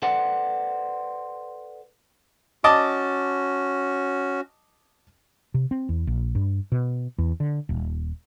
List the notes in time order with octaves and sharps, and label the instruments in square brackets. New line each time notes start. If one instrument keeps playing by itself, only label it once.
[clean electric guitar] A4 B4 C5 D5 F#5
[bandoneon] C#4 F#4 [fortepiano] D#5 A5 D6
[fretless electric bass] C3
C4
E2
A#1
G2
B2
E2
D3
D#1